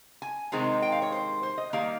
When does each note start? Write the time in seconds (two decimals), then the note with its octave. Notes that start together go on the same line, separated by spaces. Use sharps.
0.22 G#5
0.52 C3 D#3 G#3 C4 D#4
0.82 G5
0.92 F5
1.02 C#5
1.12 C5
1.43 C5
1.58 D#5
1.73 D#3 G3 A#3 D#4 F5